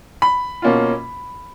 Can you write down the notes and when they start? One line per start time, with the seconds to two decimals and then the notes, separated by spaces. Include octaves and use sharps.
0.22 B5
0.62 B2 A#3 C#4 F4